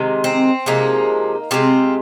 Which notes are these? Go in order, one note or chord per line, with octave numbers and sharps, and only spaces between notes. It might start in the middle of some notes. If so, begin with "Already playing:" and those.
Already playing: C3 D#3 G#3
C4
C3 F3 G#3 A#3 D#4
C3 G#3 C4 F4